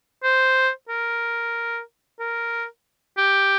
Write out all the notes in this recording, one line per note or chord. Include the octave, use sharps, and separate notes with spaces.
C5
A#4
A#4
G4